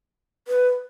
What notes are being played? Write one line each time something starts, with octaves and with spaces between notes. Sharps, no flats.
B4